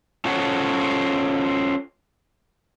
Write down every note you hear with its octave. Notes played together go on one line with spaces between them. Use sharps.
C#4 F4 A4 C5 C#5 F#5